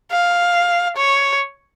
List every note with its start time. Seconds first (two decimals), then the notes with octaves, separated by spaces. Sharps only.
0.11 F5
0.97 C#5